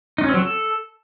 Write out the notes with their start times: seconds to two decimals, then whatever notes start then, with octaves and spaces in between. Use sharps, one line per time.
0.18 D#4
0.24 C#4
0.29 C4
0.34 F#3
0.39 A4